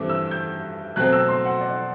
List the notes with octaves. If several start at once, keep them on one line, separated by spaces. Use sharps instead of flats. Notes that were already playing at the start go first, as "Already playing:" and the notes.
Already playing: G2 E3 A3 C4 E5 D6
E6
G6
B2 F#3 A3 C4 F#6
E6
C6
F#5
D5